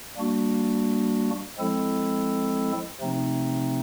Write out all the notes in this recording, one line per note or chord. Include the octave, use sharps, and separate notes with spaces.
G3 A#3 D4 F#4
F3 G#3 C4 E4 A4
C3 F3 A3 C4 D#4